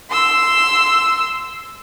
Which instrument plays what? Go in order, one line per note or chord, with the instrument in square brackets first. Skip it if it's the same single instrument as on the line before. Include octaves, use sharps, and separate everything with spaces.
[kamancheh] C6 E6